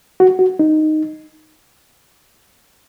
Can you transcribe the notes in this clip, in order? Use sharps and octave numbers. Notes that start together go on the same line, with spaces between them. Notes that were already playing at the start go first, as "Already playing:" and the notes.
F#4
F#4
D#4